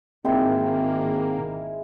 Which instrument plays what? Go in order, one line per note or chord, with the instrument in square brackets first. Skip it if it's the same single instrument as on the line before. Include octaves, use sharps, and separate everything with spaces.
[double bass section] G#1 D#3 [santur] G#3 E4 [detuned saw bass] A#3 [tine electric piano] C4 G5